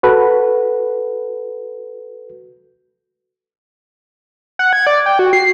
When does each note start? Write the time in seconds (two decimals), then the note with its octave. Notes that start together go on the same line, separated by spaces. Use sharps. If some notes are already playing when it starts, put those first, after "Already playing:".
0.03 F#4 A4 B4
4.59 F#5
4.73 G#6
4.87 D5
5.06 G5
5.19 F#4
5.33 C7